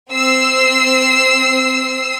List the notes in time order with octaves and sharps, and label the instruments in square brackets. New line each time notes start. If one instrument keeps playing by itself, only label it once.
[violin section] C4 E6 C7